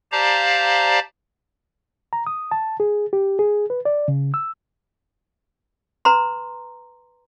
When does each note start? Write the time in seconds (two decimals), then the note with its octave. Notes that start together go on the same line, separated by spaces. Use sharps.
0.12 G4 C5 D5 F5 A5 A#5
2.13 A#5
2.27 D#6
2.51 A5
2.80 G#4
3.13 G4
3.39 G#4
3.70 B4
3.85 D5
4.08 C#3
4.34 E6
6.05 B4 A#5 C6